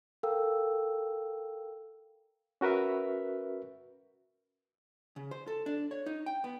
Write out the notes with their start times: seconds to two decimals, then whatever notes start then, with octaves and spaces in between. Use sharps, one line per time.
0.23 A4 A#4 F5 G5 E6
2.61 C#4 F#4 A#4 B4 E5
5.16 C#3
5.31 C5
5.47 A4
5.66 D4
5.91 C#5
6.06 D#4
6.26 G5
6.44 B3